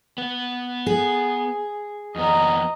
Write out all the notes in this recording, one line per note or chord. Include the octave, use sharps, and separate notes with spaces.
B3
G#4
F2 B3 D#5 A#5